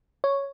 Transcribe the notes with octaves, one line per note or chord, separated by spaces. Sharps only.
C#5